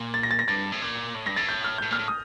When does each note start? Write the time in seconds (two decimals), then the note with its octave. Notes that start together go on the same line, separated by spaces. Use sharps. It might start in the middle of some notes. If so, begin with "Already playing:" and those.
Already playing: A#2
0.14 A6
0.23 A#6
0.31 A6
0.39 A#6
0.48 G2 A6
0.72 A2
0.82 A#2
1.14 A2
1.26 G2 A#6
1.36 A2 A6
1.49 G6
1.64 F6
1.78 A2 G6
1.91 A#2 F6
1.99 A2
2.08 D#6